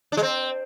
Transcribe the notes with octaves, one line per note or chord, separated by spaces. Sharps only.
D4
G#3
C4